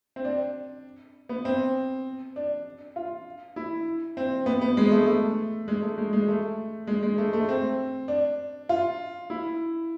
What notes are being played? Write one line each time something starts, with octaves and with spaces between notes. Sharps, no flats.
C4
D4
B3
C4
D4
F4
E4
C4
B3
B3
G#3
A3
A3
G#3
A3
G#3
G#3
A3
G#3
G#3
A3
A3
C4
D4
F4
E4